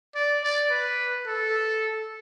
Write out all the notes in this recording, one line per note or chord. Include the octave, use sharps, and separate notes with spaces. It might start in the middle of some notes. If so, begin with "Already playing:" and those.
D5
D5
B4
A4